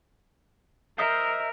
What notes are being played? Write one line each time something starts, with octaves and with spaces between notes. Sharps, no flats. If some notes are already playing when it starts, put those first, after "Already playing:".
A#4 C5 D#5 E5